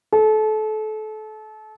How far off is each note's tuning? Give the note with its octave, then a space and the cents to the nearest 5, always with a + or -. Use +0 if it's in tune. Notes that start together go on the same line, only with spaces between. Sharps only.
A4 -30